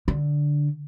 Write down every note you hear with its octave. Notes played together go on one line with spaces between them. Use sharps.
D3